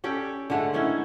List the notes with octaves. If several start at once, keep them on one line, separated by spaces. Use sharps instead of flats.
C#4 G4 A4 D5
D3 G#3 A3 F#5
D#3 C#4 D#4 E4